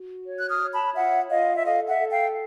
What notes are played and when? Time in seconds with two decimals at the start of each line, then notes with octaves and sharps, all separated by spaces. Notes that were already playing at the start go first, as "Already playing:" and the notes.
Already playing: F#4
0.26 C#5
0.38 F#6
0.49 D#6 F6
0.61 C#5
0.73 A5 B5
0.95 F4 E5 F#5
1.30 F4 D#5 F5
1.55 E5
1.64 A4 D#5 F5
1.87 E5 F#5
1.98 A4
2.10 F5 G5